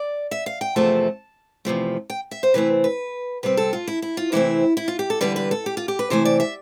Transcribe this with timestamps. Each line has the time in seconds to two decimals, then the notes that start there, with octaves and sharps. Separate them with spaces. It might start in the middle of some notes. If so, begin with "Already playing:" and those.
Already playing: D5
0.31 E5
0.46 F5
0.61 G5
0.76 E2 C3 F3 A3 C4 A5
1.65 E2 C3 F3 A3
2.10 G5
2.31 E5
2.43 C5
2.54 C3 E3 A3 C4 B4
2.84 B4
3.43 C3 G3 C4 B4
3.57 A4
3.73 F4
3.87 E4
4.02 E4
4.17 F4
4.32 C3 E3 A3 C4 E4
4.77 E4
4.88 F4
4.99 G4
5.10 A4
5.21 E2 D3 G3 B4
5.36 B4
5.51 A4
5.66 G4
5.77 F4
5.88 G4
5.99 B4
6.10 C3 E3 A3 C5
6.25 D5
6.40 E5